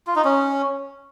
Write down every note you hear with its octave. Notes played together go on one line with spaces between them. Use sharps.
F4
D#4
C#4